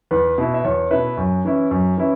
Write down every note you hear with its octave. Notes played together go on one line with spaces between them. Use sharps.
E2 B4
B2 B3 E4
E5
E2 C#5
B2 B3 E4 B4 E5
F#2
E3 C#4 E4
F#2
E3 C#4 E4